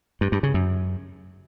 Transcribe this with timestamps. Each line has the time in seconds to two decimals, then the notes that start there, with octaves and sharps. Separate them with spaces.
0.21 G2
0.32 G2
0.43 C#3
0.54 F#2